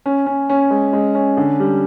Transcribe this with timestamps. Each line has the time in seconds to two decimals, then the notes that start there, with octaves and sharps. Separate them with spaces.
0.06 C#4
0.26 C#4
0.49 C#4
0.70 G#3
0.93 G#3
1.15 C#4
1.37 D3
1.60 G3